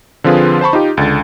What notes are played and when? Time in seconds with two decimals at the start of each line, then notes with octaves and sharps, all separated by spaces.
0.24 D3 F3 C4 F4 G#4 B4
0.61 C5 A5 B5 C#6
0.73 D#4 F4 G4
0.97 C#2 D3 A6